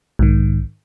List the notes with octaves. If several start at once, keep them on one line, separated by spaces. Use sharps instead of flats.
B1 G#2 D#3